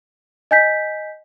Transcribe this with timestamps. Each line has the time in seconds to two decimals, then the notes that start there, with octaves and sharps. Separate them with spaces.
0.51 D#5 G#5 G6 B6